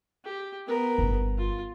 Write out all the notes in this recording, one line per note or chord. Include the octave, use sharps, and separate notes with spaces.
G4
B3 A#4
G1 G3
F4